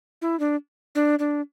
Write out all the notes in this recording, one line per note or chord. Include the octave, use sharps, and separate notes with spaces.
E4
D4
D4
D4